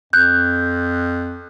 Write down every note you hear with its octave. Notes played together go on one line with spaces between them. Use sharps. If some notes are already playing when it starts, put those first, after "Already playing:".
F2 F#6 G6